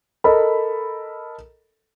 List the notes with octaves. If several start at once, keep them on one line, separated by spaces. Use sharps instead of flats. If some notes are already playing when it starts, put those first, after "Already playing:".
A4 A#4 D#5 B5